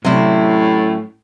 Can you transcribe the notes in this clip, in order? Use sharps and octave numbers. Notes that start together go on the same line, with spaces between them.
A2 C3 F#3 C#4 E4 D5